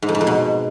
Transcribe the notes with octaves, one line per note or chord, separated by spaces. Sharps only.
G#2
F2
G#2
F2
B2